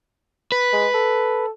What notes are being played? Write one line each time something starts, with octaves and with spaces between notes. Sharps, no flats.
B4
G#3
A4